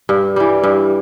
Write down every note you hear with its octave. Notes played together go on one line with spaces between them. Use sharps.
G2
E3 G3
G2